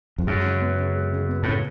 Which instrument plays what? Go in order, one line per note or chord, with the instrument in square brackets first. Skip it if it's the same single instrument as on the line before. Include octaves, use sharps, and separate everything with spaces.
[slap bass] F2
[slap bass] F#2 [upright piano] G#3
[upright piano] C#3
B3
C#3
G#3
C#3
B3
[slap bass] A2 [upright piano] C#3